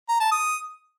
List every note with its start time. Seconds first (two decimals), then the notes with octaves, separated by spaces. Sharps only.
0.09 A#5
0.20 A5
0.32 D#6